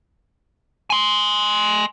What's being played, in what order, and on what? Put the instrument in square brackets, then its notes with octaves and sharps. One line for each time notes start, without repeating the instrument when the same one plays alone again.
[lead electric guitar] G#5 C6